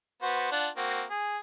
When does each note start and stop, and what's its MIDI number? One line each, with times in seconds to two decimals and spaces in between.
0.22 0.50 59
0.22 0.50 66
0.22 0.50 72
0.52 0.68 62
0.52 0.68 65
0.52 0.68 78
0.77 1.03 58
0.77 1.03 60
0.77 1.03 66
1.10 1.38 68